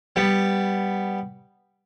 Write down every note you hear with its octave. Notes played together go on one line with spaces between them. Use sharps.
G3 B3